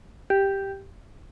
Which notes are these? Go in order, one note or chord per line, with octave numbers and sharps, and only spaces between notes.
G4